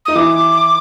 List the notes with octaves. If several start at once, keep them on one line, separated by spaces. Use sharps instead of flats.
D#4 D#6
E3 E4 D6